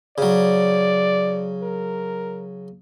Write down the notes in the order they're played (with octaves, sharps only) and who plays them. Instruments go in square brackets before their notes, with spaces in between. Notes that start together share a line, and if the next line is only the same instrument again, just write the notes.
[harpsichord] C#3 F#3 [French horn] D5
[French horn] A#4